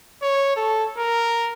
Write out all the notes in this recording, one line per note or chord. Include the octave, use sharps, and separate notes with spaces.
C#5
A4
A#4